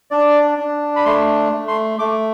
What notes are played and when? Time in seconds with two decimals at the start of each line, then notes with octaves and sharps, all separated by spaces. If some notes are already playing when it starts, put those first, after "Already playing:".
0.11 D4 D5
0.58 D4
0.96 B5
1.05 A3 C6
1.52 A3
1.68 C6
1.99 A3 D6